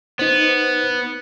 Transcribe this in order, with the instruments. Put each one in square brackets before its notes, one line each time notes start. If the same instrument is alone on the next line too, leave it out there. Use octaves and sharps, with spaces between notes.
[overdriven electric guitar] B3 [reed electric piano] D#4 C5